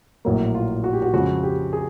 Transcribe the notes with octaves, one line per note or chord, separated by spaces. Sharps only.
A#1 A2 F#3 A#3
F4
F#4
G4
F#4
F2 C#3 F3 G#3 F#4
G4
G#4